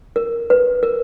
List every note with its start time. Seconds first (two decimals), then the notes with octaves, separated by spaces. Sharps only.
0.16 A#4
0.50 B4
0.83 A#4